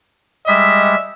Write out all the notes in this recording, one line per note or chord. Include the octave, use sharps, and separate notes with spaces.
G3 G#3 D#5 E5 B6